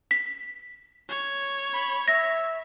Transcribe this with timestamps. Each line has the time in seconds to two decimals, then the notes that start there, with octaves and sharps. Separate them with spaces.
0.11 B6
1.09 C#5
1.73 B5
2.08 E5 A#6